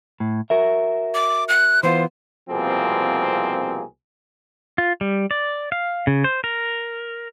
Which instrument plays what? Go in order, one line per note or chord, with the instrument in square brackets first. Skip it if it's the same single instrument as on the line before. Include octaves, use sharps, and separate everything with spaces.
[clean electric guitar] A2
F#4 A#4 E5
[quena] D6
F#6
[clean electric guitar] E3 B3 F4 [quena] C5
[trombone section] C2 B2 F3 A#3 C4 G#4
[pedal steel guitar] F4
G3
D5
F5
C#3
C5
A#4